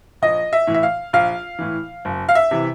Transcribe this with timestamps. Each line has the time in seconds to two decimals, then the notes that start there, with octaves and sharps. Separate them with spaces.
0.22 A#1 D#5
0.53 E5
0.67 A2 E3
0.74 E5
0.83 F5
1.13 A#1 F5
1.59 A2 E3
2.05 F#1
2.29 F5
2.35 E5
2.51 C3 E3